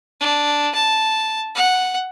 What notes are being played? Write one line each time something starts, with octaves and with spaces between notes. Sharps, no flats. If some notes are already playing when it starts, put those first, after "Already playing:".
D4
A5
F#5